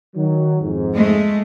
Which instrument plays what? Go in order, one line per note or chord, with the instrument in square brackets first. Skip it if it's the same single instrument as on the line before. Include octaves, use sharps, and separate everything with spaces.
[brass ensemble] D#3 F#3
F2 G#2
[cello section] G#3 A3